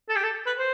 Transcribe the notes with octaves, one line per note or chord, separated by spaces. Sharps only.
A4
G4
A4
B4
C5